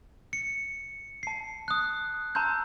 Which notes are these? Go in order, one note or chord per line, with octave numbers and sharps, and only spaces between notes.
C#7
A5 C7
D#6 F#6
A5 A#5 C6 E6 G6